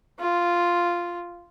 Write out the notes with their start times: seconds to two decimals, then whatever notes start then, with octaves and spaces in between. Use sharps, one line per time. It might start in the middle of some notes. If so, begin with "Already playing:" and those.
0.20 F4